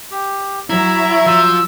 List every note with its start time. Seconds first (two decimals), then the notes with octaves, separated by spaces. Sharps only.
0.11 G4
0.70 F#3 E4 E5 A#5
1.26 F3 E6